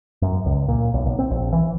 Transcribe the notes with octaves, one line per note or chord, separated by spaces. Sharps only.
F#2
C#2
A#2
B1
B1
C4
A#1
E3